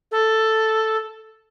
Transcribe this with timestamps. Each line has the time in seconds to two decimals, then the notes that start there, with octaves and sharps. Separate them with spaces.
0.12 A4